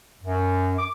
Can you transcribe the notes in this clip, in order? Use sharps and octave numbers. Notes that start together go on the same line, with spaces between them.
F#2
D6